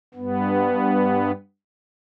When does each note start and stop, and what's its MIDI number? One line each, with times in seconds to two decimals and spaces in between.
0.14 1.32 43
0.14 1.32 59